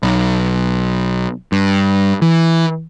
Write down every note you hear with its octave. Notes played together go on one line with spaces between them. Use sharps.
B1
G2
E3